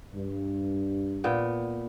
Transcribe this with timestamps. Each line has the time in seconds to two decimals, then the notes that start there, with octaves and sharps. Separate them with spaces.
0.13 G2
1.24 A#2 B3 G5